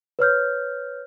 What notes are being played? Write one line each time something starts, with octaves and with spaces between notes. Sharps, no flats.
B4 C#5 F6 G6